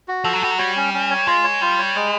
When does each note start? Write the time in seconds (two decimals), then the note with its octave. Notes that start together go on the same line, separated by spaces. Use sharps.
0.08 F#4
0.24 F3 A4
0.33 F#3
0.42 G3 F#4
0.51 F#3
0.59 G3 C#5
0.76 C#4
0.94 C#4
1.10 C#5
1.27 G#3 F4
1.44 C#5
1.61 G3 F4
1.78 C#5
1.95 G#3